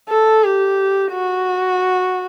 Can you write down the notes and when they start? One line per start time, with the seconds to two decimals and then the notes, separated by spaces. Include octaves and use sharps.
0.09 A4
0.43 G4
1.12 F#4